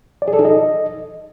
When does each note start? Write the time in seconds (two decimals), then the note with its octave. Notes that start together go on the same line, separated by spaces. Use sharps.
0.22 D5
0.28 G#4
0.33 A4
0.39 D#4
0.45 D#5